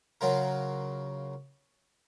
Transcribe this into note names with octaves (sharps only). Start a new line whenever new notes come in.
C#3 F#3 F4 A#4